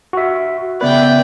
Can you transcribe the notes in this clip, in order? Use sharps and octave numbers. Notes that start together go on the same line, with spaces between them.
F#4 E5
C#3 B3 B4 D5 E5 G5